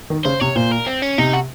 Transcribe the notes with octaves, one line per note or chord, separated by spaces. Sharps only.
D#3
C#3 C5
C3 C#5
A#2 C5
A#4
C4
C#4
C3 D#4
F#4